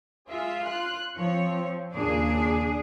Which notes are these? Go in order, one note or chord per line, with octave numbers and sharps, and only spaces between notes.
G#3 F4 E5
C6 F#6
F3 C4 C#5
D#2 A#2 C#3 D4 G#4